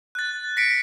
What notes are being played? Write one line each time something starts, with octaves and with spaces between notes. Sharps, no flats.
F#6 A6
A#6 B6 C#7 D7